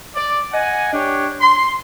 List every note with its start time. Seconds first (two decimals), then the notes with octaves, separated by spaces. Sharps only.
0.16 D5
0.53 D#5 F#5 G#5
0.93 D4 G4 C#5
1.40 C6